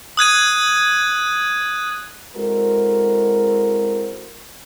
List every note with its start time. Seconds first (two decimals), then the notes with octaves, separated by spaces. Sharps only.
0.17 D#6 F#6 G#6 D#7
2.36 G#3 C4 E4 F#4 A4 A#4